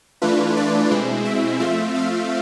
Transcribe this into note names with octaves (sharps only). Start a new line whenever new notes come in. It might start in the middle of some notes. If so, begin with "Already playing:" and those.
E3 A3 D4 F4 B4
D5
B2 G#3 C4 E4
E5
F3 A3 C4 F4 E5
F5